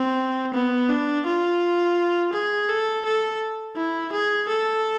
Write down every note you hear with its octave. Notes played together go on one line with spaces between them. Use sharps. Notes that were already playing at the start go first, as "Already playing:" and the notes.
Already playing: C4
B3
D4
F4
G#4
A4
A4
E4
G#4
A4